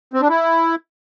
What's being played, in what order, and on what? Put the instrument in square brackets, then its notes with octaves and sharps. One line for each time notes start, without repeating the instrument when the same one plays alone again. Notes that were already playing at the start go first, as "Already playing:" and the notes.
[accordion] C4
D4
E4